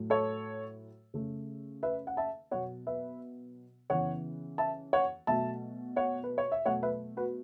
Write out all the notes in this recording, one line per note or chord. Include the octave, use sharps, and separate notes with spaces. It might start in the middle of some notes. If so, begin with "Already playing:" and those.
Already playing: A2 F#3 A3
A4 C#5
C#3 A3
B4 E5
F#5
E5 A5
B2 F#3 B3 C#5 F#5
B4 E5
C#3 E3 B3 C#5 F#5
E5 A5
C#5 F#5
B2 F#3 A3 E5 A5
C#5 F#5
B4
C#5
E5
B2 F#3 A3 C#5 F#5
B4 E5
F#4 B4